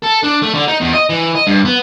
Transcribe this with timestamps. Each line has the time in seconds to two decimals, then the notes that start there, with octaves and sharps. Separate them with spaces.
0.02 A4
0.23 D4
0.42 A3
0.54 D3
0.68 D#4
0.80 E2
0.93 D#5
1.09 E3
1.35 D#5
1.47 G2
1.65 B3